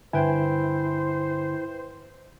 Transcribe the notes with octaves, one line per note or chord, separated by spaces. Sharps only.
G2 D3 E4 B4 C5 G5 G#5